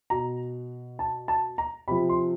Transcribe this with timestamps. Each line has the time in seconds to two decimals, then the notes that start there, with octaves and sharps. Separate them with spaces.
0.10 B2 A#5
0.99 A5
1.28 A5
1.58 A#5
1.88 C3 F3 B5
2.09 C6